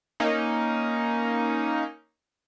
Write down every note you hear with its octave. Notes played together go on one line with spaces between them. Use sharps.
A#3 C#4 D#4